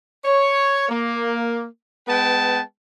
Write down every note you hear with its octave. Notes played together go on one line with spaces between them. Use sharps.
C#5
A#3
G#3 B3 B4 G5 A5